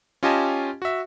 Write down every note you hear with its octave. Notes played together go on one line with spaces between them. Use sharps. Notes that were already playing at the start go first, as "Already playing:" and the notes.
C#4 F4 G4 D#5 G#5 A5
F#4 E5